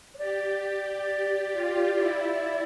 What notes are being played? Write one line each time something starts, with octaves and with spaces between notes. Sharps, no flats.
C#5
G4 D5
G4
G4
F4
E4